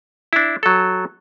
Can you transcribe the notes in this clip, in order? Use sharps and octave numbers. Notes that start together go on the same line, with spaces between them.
D4 E4
F#3 A4